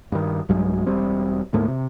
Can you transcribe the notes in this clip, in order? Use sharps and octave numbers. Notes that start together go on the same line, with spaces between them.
G2 D#3
B1 G2 F#3 G#3
E1 G3 C4
D2 G#2 A3 A#3
C3